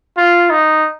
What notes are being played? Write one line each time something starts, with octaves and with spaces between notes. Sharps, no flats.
F4
D#4